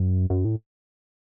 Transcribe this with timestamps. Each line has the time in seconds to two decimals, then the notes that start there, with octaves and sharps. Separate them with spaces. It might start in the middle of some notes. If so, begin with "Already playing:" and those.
Already playing: F#2
0.30 F#2
0.45 A2